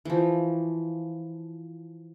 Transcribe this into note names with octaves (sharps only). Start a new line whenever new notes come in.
E3 F3